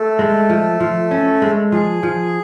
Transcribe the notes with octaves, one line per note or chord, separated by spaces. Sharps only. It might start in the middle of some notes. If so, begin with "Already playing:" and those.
Already playing: A3 A4
G#3
F3
F3
C#4
G#3
F3 G#4
F3